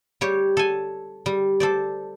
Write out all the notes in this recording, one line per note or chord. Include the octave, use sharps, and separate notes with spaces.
G3 G4 C#5
A4 G#5
G3
A4 C5 D5